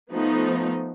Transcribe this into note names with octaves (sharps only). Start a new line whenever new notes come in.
F3 A3 B3 D#4